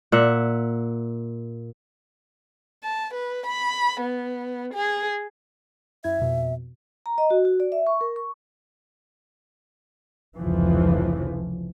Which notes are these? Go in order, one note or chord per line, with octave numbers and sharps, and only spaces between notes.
A#2 E5 F#5
A5
B4
B5
B3
G#4
F#2 E4 E5 G#6
F2 B2
A#5
D#5
F#4
F#4
D5
E5
C#6
A#4
C#6
F1 C#2 E3 F3